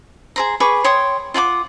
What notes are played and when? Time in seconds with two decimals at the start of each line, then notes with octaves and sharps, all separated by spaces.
0.36 G#4 C5 A#5
0.60 G#4 B4 C#6 D6
0.84 C#5 G5 C6 D#6
1.34 F4 F#5 G#5 D6